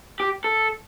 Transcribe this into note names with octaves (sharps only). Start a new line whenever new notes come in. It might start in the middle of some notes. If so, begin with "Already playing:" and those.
G4
A4